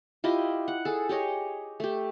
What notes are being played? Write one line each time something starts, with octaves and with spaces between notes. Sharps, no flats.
E4 F4 G4 D#5
F#5
G#4 A4
G4 G#4 C#5 D#5
A3 G4